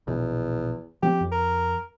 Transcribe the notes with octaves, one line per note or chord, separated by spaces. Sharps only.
A#1 E2 B2
F3 B3 C4 G4
F2
A#4